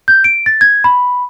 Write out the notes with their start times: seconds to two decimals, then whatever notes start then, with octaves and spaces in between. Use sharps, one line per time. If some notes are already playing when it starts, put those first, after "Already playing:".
0.08 G6
0.24 D7
0.46 A6
0.61 G#6
0.84 B5